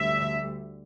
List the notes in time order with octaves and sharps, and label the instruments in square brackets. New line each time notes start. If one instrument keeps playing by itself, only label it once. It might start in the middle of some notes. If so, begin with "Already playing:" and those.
Already playing: [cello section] D2 D3 G3 E5